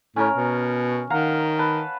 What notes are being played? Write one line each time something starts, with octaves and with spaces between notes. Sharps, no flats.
A2 C#4 A#4
B2
D#3 F5 F#5 A#5
B4 A5